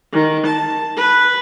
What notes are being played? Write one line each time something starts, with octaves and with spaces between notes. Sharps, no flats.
D#3
A5
B4